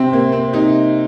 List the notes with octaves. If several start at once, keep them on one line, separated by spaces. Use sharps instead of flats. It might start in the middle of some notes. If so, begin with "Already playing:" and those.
Already playing: C3 C4
C3 A#3
C4
C3 D#4